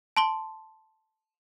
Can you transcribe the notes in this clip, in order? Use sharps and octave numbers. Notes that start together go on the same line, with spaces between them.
A5 C6 G7